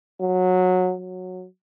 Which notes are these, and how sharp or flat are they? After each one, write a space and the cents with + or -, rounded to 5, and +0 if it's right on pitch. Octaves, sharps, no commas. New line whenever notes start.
F#3 -15
F#3 -15